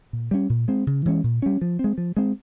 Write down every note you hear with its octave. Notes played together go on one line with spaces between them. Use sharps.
A#2
G3 A#3 C#4
A#2
G#3 C4
C#3
E3 G#3 C#4
A#2
G3 C#4
F3
G#3 C4
F3
G#3 C4